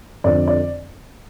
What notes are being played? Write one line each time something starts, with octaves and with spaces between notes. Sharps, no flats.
F2 D3 F3 C4 D5
D5